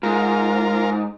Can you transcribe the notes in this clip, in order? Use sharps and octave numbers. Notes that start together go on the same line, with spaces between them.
G#2 F4 A#4